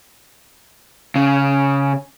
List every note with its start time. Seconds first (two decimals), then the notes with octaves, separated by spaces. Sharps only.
1.16 C#3